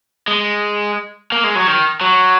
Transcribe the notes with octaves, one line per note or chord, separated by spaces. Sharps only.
G#3
A#3
G#3
F#3
D#3
F#3